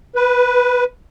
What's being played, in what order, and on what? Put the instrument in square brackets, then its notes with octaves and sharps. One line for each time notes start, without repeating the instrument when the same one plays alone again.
[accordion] B4